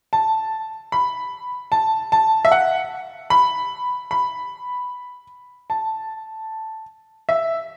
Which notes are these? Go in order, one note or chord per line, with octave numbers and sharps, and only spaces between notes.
A5
B5
A5
A5
E5
F#5
B5
B5
A5
E5